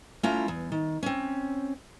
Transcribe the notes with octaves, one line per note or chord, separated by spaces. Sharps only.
A3 C#4 E4 F4 A#5
E2
D#3
C4 C#4